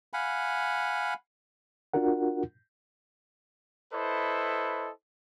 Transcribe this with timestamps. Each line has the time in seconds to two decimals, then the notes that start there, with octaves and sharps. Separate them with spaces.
0.13 F5 F#5 G#5 B5
1.94 D4 F4 F#4 A#4 F#5
3.93 E4 A4 B4 C5 D#5